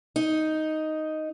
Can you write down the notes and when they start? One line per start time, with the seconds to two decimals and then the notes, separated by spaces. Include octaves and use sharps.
0.16 D#4